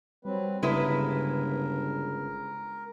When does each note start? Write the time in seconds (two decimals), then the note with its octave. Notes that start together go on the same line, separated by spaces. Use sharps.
0.25 F#3 G3 C4 B4
0.62 G1 C#3 G#3 E4 A#4 B4